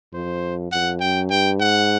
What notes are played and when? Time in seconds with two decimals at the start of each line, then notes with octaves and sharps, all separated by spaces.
0.13 F2 C5
0.71 F2 F#5
1.00 F#2 G5
1.30 G2 G5
1.59 G#2 F#5